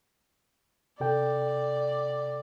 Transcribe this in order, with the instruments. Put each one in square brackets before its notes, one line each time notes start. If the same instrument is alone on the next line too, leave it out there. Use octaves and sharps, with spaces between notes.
[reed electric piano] C3 A4 G5 [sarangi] D5